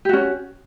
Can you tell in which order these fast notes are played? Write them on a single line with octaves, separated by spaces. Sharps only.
G4 F#4 C#4